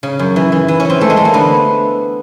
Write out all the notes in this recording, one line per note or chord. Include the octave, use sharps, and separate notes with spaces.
C#3
F#2
E3
E3
E3
C#4
E3 C4
E3 A3
G#3
E3 A3
A#3
D3 B3